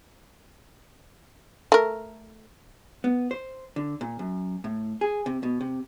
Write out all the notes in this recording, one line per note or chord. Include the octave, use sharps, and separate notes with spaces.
A3 A#4
B3
C5
D3
A#2
F#2
A2
G#4
C3
B2
C3